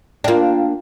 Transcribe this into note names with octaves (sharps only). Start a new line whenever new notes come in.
A#3 D4 F4 F5 G5